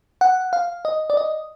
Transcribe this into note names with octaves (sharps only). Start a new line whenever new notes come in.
F#5
F5
D#5
D5
D#5